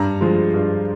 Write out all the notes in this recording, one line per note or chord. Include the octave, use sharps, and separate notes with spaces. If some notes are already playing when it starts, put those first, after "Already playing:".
Already playing: G2 A#5
F3 G#3
G2